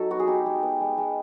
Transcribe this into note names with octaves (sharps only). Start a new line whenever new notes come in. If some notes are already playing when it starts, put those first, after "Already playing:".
Already playing: F#3 D#4 A4
B3 F#4
G#4
D#4 G4
G#3
B3
G#3
G#3